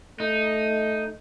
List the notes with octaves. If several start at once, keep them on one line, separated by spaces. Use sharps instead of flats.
A3 D#4